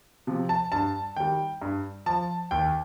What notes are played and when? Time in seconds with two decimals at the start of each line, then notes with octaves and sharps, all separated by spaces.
0.27 C3 F3
0.49 A5
0.72 G2 A5
1.16 D#3 G3 G5
1.62 G2
2.06 F3 A5
2.51 D#2 G5